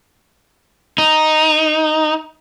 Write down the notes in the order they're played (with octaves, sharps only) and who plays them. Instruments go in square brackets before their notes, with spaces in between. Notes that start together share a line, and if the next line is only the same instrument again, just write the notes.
[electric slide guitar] D#4